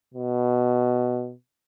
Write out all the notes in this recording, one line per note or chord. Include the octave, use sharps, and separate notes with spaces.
B2